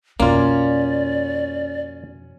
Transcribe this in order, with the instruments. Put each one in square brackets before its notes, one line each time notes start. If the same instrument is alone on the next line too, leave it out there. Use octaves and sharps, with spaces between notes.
[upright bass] F2 B2 [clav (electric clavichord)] A#3 F4 [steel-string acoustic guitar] C#4 [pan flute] D5